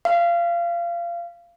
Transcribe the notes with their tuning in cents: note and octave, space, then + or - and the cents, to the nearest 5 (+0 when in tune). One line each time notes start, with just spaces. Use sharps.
F5 -25